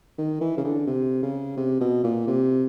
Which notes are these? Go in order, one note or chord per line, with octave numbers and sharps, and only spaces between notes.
D#3
E3
C#3
D3
C3
C#3
C3
B2
A#2
C3